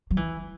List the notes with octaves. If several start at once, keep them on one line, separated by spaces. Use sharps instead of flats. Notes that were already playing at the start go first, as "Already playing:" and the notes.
F#3
E3